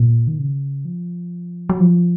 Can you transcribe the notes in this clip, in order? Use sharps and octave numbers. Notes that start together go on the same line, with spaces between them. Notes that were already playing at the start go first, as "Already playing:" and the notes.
Already playing: A#2
D#3
C#3
F3
F#3
F3